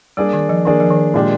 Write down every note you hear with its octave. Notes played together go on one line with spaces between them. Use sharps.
G3 A#3 D4 G#4 D5
D#3
F3
D#3 A#3 D4 G#4 D5
F3
D#3
A#2 G#3 D4 G4